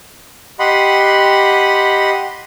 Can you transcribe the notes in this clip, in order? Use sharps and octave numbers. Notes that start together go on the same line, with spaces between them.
G4 D#5 F#5 B5 C6